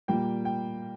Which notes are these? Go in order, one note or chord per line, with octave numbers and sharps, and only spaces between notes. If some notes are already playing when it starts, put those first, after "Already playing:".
A#2 G3 A#3 G5
G5